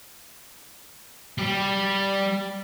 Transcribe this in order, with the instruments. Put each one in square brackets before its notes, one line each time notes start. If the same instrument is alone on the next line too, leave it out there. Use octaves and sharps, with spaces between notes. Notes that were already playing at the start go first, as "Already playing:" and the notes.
[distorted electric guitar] G3 G4